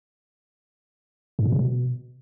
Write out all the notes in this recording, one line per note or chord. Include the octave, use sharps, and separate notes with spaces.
G#2
B2
C#3
B2